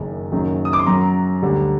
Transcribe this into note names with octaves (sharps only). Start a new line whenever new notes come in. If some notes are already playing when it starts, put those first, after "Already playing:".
Already playing: F#1 F#2 D#3
F#1 F#2 D#3 F#3
D#6
D6
C6
F#2 F#3 A#5
D2 D3 G3